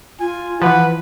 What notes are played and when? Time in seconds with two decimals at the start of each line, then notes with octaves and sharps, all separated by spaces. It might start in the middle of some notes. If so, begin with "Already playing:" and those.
0.20 F4 G#5
0.62 E3 F3 B4 F#5